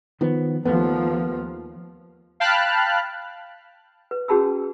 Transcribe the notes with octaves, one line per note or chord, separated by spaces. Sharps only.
D#3 F3 B3
D#2 F3 A3 B3
F5 G5 A5 B5 F6 F#6
B4
C#4 F#4 G#4 A5 B5 E6